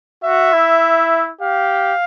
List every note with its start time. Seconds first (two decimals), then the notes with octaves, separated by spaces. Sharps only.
0.24 F#4 E5
0.53 E4
1.41 G4 F5